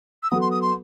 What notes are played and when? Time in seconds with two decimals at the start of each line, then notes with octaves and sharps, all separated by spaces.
0.23 E6
0.31 F#3 B3 F#4 A4 D#6
0.41 C6
0.51 D#6
0.62 C6